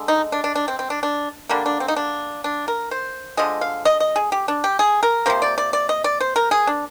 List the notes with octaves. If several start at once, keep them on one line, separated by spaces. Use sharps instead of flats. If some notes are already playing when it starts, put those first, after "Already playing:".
Already playing: D3 G#3
D#4
D4
D4
D4
C4
C4
D4
D4
D3 G3 A#3 D4
D4
C4
D#4
D4
D4
A#4
C5
D3 F3 G#3 D#5
F5
D#5
D#5
G#4
G4
D4
G4
G#4
A#4
C3 F3 A#3 C5
D5
D5
D5
D#5
D5
C5
A#4
G#4
D4